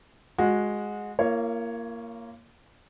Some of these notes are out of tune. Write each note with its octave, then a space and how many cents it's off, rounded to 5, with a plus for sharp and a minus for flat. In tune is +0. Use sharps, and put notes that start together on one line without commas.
G#3 +0 F#4 -20
A#3 -5 F4 -45 C#5 +0